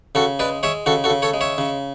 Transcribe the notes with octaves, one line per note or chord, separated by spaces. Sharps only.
C#3 F#4 A4
G#3 B4 D5
G#3 C#5 E5
C#3 F#4 A4
F#4 A4
C#3
A4 C#5
G#3
C#5 E5
C#3